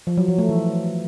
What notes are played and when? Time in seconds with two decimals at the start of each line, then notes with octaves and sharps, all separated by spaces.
0.07 F3
0.17 F#3
0.28 F3
0.38 A3
0.49 E3